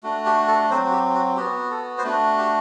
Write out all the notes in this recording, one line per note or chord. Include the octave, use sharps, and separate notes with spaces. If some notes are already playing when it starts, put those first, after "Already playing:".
A3 D4 F#4
G4
A4
F#3 C4 F#4 C5
F#4
G4
F#4
B3 F#4 G4
A4
C5
A3 D4 F#4 B4
G4